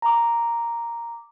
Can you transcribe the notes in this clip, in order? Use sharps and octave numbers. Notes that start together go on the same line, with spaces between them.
A#5 D6